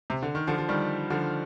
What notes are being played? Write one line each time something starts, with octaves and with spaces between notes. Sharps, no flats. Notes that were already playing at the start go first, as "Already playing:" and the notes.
C3
D3
D#3
D3 F3
F3
D#3 G3
D3 F3